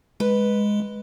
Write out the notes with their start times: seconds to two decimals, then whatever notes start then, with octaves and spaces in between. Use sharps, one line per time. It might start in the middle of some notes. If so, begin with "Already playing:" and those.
0.20 G#3 B4